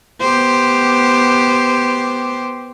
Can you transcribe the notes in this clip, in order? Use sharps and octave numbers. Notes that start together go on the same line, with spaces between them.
B3 G4 C5